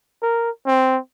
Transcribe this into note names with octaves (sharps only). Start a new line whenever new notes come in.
A#4
C4